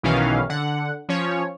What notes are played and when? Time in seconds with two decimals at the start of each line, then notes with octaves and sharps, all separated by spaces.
0.03 B1 B2 D#3 E3 C#4 F5
0.49 D3 F#5
1.09 F3 C#4 C#5